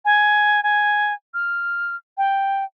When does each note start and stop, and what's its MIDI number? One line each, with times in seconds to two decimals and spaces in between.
0.05 0.61 80
0.63 1.14 80
1.34 1.96 89
2.18 2.64 79